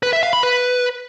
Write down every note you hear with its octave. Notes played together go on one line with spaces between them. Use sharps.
B4
E5
F5
B5
B4